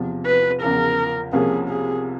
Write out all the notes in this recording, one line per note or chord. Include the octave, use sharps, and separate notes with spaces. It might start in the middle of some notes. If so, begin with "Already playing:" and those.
Already playing: E2 C3 F3
B4
E2 C#3 F3 A#4
C2 C3 F3 A#3 C#4 G#4
G#4